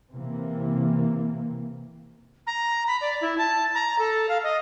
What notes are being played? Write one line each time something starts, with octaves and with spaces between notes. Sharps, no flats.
C3 E3 A#3
A#5
B5
D5
E4
A5
A#5
A4
F5
D#5